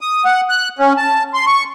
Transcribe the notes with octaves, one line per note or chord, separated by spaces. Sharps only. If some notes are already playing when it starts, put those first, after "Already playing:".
D#6
F#5
F#6
C#4
A5
C6
C#6